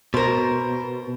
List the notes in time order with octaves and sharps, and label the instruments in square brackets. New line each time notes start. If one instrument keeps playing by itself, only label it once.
[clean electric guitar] B2 [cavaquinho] A#4 C5